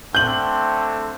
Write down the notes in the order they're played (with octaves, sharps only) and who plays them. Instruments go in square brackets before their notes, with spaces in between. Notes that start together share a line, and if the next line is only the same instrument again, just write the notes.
[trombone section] D3 A3 C4 [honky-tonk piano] G6 F#7